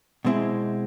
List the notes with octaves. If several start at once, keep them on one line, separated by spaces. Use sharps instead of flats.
B2 G#3 C4 E4